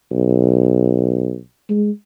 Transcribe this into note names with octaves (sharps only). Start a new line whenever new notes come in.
B1
G#3